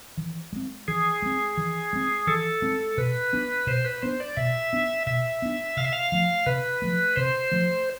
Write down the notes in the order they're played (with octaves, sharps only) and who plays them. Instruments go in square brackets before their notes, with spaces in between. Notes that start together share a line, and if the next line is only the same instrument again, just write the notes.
[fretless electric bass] E3
G#3 C4
[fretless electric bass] E3 [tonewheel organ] G#4
[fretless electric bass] G#3 C4
E3
G#3 C4
[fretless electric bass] E3 [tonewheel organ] A4
[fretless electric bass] G#3 C4
[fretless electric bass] B2 [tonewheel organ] B4
[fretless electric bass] B3 D4
[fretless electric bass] B2 [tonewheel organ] C5
[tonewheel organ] B4
[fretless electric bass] B3 D4 [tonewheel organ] C5
[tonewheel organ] D5
[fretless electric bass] B2 [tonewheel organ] E5
[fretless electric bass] B3 D4
[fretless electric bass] B2 [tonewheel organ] E5
[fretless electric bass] B3 D4
[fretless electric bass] C3 [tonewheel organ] F5
[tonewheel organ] E5
F5
[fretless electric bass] F3 A3
[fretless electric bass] C3 [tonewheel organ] B4
[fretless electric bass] F3 A3
[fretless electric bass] C3 [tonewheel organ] C5
[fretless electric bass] F3 A3